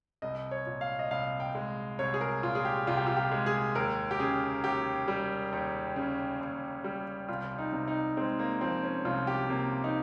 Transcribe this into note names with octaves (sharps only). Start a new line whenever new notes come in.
C2 D#5
C#5
A#2
F5
D#5
C2 F5
G5
G#3
C2 C#5
G#4
A#4
A#2 F4
G#4
G4
C2 F4
G4
F4
G4
G#3
G#4
D#2 A#4
G4
C#3 G#4
D#2 G4
G3
D#2
C#3
D#2
G3
C2 F4
D#4
C3
D#4
G#3 C4
A#3
F3 C4
C#4
C2 F4
G4
C3 A#3
D#4